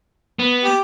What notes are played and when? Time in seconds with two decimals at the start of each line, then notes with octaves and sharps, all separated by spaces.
0.39 B3
0.64 G4